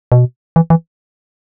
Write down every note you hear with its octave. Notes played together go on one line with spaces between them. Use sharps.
B2
E3
E3